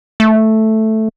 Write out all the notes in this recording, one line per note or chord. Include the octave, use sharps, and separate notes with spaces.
A3